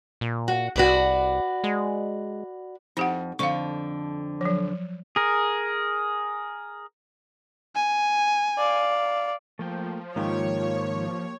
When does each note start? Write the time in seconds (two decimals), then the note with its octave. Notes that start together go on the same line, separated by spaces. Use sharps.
0.21 A#2
0.48 F#4
0.76 C2 F#4 B4 D5
1.64 G#3
2.97 F2 D#4 G4 F#5
3.39 F2 D3 F5 C#6
4.41 F3 F#3
5.16 G#4 A#4
7.75 G#5
8.58 D5 F5
9.59 F3 A3 A#3 G5
10.16 G#2 D#3 A#3 F4 G4 C#5